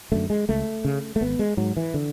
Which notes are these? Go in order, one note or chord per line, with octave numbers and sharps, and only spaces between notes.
F#2 D3 A3
G#3
C#2 A3
C#3
A3
G#1 B3
G#3
G#2 F#3
E3
D3